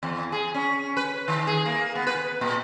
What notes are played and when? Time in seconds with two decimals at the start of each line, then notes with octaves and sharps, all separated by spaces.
0.03 E2
0.32 G#4
0.54 C#4
0.97 B4
1.28 D#3
1.47 G#4
1.66 A#3
1.95 B3
2.07 B4
2.41 A#2